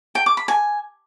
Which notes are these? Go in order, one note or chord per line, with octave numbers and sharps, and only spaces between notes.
G5
D6
B5
G#5